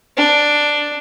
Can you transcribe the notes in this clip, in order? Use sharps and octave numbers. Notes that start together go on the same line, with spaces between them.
D4